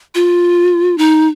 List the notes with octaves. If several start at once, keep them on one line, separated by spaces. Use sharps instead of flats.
F4
D#4